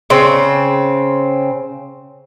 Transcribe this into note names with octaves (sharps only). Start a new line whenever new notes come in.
C#3 C4